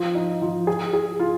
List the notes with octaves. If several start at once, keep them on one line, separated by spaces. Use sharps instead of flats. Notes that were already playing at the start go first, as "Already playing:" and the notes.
Already playing: F3
D#4
F3
G#4
G#4
F4